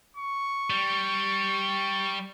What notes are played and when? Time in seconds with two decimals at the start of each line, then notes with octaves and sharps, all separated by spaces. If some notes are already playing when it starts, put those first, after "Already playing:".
0.17 C#6
0.70 G3